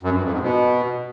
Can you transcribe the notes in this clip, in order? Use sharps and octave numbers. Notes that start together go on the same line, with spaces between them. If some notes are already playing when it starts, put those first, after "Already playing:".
F#2
G2
F2
G#2
B2